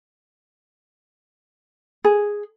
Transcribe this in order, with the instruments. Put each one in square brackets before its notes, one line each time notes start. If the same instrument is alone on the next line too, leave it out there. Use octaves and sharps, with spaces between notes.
[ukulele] G#4